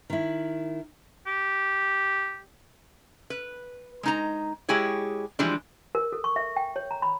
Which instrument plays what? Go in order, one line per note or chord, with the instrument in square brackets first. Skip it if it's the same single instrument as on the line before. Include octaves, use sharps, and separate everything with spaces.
[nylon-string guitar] D#3 E4
[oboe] G4
[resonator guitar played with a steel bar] B4
G#3 D#4 A#5
G#3 E4 G4 G#4 C#5
E3 F3 G3 G#3 D4
[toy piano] A#4
A4
C#6
E5
G5
C#5
A#5
B5